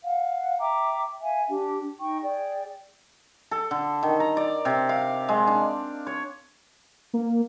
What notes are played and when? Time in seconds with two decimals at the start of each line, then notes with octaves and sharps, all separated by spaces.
0.03 F5 F#5
0.58 E5 G5 A#5 D6
1.21 E5 F5 G#5
1.49 D4 G4
1.99 D#4 G5 C#6
2.21 G#4 D5 G5
3.51 A4
3.71 D3
4.03 D#3
4.20 A#5
4.37 D5
4.65 C3
4.89 F5
5.29 G#3
5.47 D4
6.07 C#5
7.13 A#3